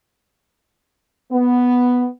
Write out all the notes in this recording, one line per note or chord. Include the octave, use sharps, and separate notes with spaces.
B3